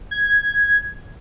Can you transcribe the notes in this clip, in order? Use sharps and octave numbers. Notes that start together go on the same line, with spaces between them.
G#6